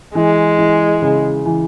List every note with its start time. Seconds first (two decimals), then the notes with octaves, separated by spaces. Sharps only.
0.15 E3 G#3
0.58 E3
1.02 C#3
1.46 E3